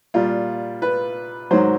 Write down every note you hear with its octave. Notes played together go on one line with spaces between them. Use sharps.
A#2 G3 F4
B4
G#2 D#3 F#3 C5